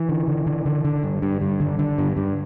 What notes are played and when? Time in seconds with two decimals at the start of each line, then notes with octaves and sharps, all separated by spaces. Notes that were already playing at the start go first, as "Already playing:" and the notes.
Already playing: E3
0.09 D3
0.28 D3
0.46 D3
0.66 D3
0.85 D3
1.03 G2
1.22 G2
1.41 G2
1.60 D3
1.79 D3
1.98 G2
2.17 G2